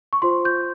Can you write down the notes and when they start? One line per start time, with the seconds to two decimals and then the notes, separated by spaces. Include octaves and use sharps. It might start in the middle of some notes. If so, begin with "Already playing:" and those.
0.13 C#6
0.22 F4 C5 C6
0.45 G6